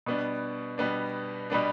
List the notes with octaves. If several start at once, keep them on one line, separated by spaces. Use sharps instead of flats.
B2 G3 B3 D4
B2 G3 B3 D4
B2 G3 B3 D4